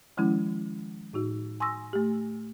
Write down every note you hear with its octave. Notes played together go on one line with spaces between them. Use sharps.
D#3 F3 G#3 C#4 E4
A2 D#4 F#4
G#5 C6 C#6 D#6 E6 A#6
A3 G4